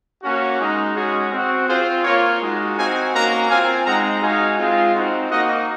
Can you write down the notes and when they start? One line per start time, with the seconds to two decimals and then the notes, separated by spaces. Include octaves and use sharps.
0.22 A#3 C#4 F#4
0.58 G#3 D#4 F#4
0.95 G#3 C#4 F#4 G#4
1.31 C4 F#4
1.67 C4 F4 G#4 C5
2.03 A#3 F4 A#4 C#5
2.40 G#3 D#4 F#4
2.76 C4 D#4 F#4 F5 G#5
3.12 A#3 C#4 F#4 F#5 A#5
3.49 C4 F4 F5 G#5
3.85 G#3 C4 D#4 F#5 A#5
4.21 G#3 D#4 F#4 F5 G#5
4.58 G#3 C4 F4
4.94 C4 D#4 F#4
5.30 A#3 D#4 F#4 D#5 F#5